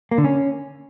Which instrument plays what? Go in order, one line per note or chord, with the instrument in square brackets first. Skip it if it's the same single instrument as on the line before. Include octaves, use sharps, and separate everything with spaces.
[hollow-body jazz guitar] A#3
D3
C#4